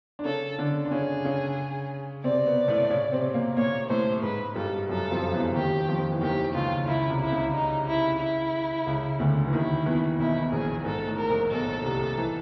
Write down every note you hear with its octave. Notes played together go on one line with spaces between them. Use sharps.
D4
C#3 C#4 A4
D3 D4
D4
C#3 C#4 G#4
C#3 C#4
C3 C4 D5
B2 B3
A2 A3
C#3 C#4
C3 C4
A#2 A#3
A#2 A#3 C#5
A2 A3 C5
G#2 G#3 B4
G2 G3 A4
F#2 F#3 A4
F2 F3
E2 E3
D#2 D#3 G4
F2 F3
E3
D#2 D#3 G4
C#2 C#3 F4
C#2 C#3 E4
C2 C3
E4
C#2 C#3
D#4
E4
E4
C#2 C#3
D2 D3
E3
D#2 D#3 E4
E2 E3
B1 B2 E4
B2
A#1 A#2 G#4
G#2 A4
A2
A#4
A#1 A#2
B1 B2 A4
C2 C3
E3